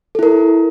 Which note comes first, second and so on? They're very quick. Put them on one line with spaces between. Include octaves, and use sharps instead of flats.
A4 E4 A#4